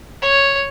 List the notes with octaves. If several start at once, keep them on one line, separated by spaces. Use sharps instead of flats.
C#5